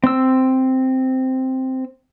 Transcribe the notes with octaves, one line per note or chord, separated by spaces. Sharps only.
C4 E6